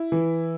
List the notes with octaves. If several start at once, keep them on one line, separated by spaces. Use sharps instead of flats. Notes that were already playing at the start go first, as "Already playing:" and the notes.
Already playing: E4
E3